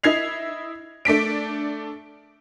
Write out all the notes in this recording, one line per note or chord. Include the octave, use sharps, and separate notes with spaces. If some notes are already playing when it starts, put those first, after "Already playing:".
E4 D#5 G#6 C7 F7
A3 D4 B6 D7